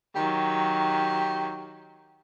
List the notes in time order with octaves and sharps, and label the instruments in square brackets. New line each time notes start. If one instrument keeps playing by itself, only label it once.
[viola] D#3 F#3 [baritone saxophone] G4